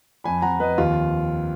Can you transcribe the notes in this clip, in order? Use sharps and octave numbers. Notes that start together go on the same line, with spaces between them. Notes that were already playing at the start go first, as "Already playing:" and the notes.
F2 G#5 B5
F2 F#5 A#5
F2 B4 D#5
D#2 F4